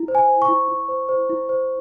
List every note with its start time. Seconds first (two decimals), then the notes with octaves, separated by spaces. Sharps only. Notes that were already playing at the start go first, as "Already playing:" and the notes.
Already playing: E4
0.08 C5
0.15 G#5
0.28 C5
0.42 C#6
0.48 E4
0.68 E4
0.88 C5
1.09 C5
1.29 E4
1.49 C5